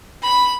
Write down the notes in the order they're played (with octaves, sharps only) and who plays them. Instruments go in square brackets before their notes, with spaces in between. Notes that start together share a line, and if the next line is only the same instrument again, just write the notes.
[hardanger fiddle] B5